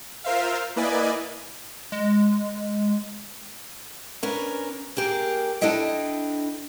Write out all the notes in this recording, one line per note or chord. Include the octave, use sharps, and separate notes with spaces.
F4 A#4 C5 E5 F5
A#3 E4 B4 D5 D#5 G#5
G#3
C#4 D4 A#4 B4
A#3 G4 G#4 A#4
D4 E4 A4 D#5 G5